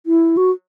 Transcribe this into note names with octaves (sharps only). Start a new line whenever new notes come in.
E4
F#4